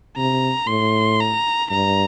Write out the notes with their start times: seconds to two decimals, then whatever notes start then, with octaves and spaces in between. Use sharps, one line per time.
0.17 C3 A#5
0.67 A2 C6
1.20 A#5
1.70 G2 A#5